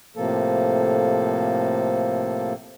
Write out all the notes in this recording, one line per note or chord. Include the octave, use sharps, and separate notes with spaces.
A2 C3 F3 A#3 A4